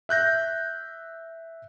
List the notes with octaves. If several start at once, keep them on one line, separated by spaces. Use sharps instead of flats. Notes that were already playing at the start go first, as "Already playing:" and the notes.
E5 F#6 G6 A#6